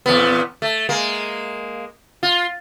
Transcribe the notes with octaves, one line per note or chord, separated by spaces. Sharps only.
E2 A#2 B3
A3
G#3 A#3
F4